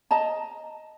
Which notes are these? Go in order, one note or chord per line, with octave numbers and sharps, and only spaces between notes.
D#5 A5 A#5